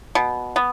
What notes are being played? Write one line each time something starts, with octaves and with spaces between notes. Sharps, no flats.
B2
B3